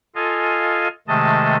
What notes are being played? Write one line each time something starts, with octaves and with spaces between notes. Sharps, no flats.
F4 A4 D#5 F5 G#5
C3 D#3 G#3 A3 D#5 A5